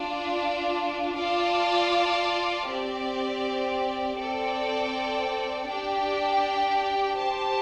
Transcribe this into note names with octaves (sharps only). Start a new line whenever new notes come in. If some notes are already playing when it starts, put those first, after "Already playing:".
Already playing: D4 F4 D5
F4 D5 F5 A5
C4 G4 D5
C4 A4 D5 G5
D4 G4 D5 G5
G4 C5 A5